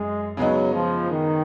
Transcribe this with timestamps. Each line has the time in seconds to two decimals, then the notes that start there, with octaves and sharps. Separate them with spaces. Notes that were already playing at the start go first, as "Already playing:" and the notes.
Already playing: F#2 G#3
0.37 C#3 F#3 G#3 B3 D#4
0.73 F3
1.10 D#3